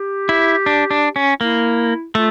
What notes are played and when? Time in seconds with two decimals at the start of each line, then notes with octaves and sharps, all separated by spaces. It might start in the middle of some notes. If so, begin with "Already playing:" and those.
Already playing: G4
0.29 E4
0.66 D4
0.91 D4
1.16 C#4
1.40 A#3 E4
2.15 A3 F4